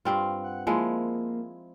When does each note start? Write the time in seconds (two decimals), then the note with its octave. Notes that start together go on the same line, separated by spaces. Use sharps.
0.05 G2 C4 F4
0.44 F#5
0.67 F3 G#3 A#3 E4